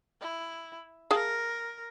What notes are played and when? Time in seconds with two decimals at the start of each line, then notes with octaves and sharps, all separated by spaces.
0.21 E4
1.11 G#4 A#4 F5 A5